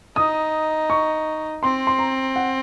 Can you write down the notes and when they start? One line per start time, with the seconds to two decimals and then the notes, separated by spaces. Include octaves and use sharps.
0.16 D#4 D#6
0.90 C#6
1.63 C4 C6
1.87 C6
1.99 A#5
2.36 F#5